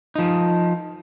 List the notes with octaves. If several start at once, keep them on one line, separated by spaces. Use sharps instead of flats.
F3 D#4